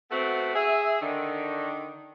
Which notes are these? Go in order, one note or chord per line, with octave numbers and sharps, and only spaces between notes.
A3 B3 C4 F#4
G#4 E5
D3 D#3